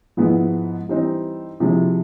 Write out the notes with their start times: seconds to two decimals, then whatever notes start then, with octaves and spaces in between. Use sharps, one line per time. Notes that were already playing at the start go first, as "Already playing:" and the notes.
0.17 G#2 F3 G#3 B3 E4
0.89 E3 G3 C4 D#4
1.60 C3 F3 G#3 C4 E4